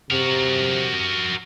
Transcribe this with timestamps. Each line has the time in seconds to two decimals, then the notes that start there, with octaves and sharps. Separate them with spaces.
0.11 C3 F#4 A#4